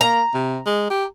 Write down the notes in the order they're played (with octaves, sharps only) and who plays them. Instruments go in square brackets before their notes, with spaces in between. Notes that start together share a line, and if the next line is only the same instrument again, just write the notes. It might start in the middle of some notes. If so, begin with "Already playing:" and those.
[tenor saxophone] A#3 [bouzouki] A#5
[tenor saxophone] C3
G#3
G4